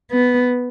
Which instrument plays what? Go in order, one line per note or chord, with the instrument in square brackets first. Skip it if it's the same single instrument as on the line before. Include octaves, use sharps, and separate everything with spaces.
[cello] B3